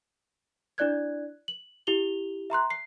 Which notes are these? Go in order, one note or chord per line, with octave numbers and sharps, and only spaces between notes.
D4 E4 D5 F#6 G#6
F#7
E4 G4 F7 G7
E5 A#5 C6 F#6
C7